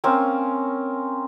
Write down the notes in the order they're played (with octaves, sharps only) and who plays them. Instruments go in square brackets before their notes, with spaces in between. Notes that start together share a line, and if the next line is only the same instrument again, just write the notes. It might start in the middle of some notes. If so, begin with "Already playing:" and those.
[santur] A#3 C4 C#4 A#4